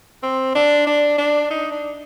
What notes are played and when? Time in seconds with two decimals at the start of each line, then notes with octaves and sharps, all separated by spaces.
0.23 C4
0.55 D4
0.87 D4
1.18 D4
1.50 D#4
1.72 D4